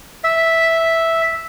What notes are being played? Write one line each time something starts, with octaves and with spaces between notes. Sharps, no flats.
E5